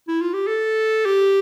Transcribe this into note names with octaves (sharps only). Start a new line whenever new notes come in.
E4
F4
G4
A4
G4